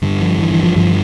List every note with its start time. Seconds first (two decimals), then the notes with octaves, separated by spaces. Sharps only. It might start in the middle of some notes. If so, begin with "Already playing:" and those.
0.02 G2 D3
0.20 F3
0.39 E3
0.51 E3
0.63 F3
0.76 G2 D3 F3